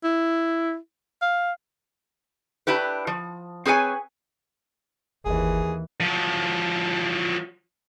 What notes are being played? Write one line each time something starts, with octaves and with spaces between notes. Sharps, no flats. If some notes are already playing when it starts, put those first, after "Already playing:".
E4
F5
D4 E4 G4 B4
F3
C4 G#4 B4 C#5 G#5
G1 D#2 E3 G#4
F3 F#3